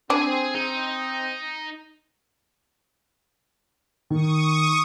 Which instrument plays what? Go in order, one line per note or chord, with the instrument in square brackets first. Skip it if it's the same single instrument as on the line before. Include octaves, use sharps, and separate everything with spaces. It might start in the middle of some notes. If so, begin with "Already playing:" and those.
[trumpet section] C4 [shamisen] D4 [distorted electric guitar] G#4 G#5
[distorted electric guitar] D#4
[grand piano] D#3 [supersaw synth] C#6 D#6